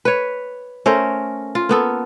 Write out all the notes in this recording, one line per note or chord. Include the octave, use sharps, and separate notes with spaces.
B4 C#5
A3 C#4 A#4 C5
F4
A#3 B3 A4